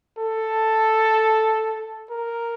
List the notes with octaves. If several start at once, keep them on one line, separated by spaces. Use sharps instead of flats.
A4
A#4